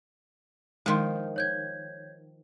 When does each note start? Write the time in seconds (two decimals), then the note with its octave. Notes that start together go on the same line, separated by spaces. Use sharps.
0.86 D#3 F3 G#3 C6
1.36 C#5 G6 G#6